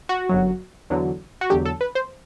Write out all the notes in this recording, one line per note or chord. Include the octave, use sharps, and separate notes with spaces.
F#4
G1 F#2 F#3
E2 D3 F#3
F#4
E2 D3 F#3 G4
A4
B4
C5